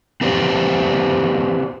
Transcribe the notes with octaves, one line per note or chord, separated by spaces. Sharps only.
C4 F#4 G4 B4 C5 D5